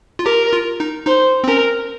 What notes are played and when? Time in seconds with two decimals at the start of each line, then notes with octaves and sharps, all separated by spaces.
0.19 F4
0.26 G4 A#4
0.53 F4
0.80 D#4
1.07 D#4 C5
1.44 C4
1.48 C#4 A#4